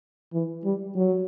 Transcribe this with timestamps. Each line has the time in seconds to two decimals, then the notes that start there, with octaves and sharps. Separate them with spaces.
0.33 E3
0.64 G3
0.96 F#3